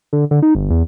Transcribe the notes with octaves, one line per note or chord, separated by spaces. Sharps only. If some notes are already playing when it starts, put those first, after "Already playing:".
D3
D3
D#4
G1
E2